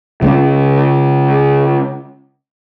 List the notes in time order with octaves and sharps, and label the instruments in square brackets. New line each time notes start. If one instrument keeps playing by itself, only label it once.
[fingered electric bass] C#3 G#3 A#3 C#4